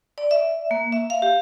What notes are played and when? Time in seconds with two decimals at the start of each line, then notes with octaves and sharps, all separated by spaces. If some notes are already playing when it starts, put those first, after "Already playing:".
0.18 D5
0.31 E5
0.71 A#3
0.92 E5
1.10 F5
1.22 G4